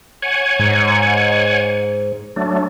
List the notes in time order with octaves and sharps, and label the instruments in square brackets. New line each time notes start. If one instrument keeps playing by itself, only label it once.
[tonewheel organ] C#5 F#5 G#5
[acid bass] G#2
[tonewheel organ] F#3 A3 D4